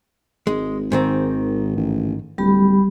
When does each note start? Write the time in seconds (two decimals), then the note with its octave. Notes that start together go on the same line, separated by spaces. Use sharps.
0.47 G#1 G#3
0.92 G#2 D#3 C4
1.76 A1
2.38 D1 G3 G4 B5